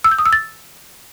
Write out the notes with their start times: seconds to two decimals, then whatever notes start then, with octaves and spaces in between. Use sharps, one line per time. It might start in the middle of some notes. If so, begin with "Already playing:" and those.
0.04 E6
0.11 G6
0.18 D#6
0.26 E6
0.33 A6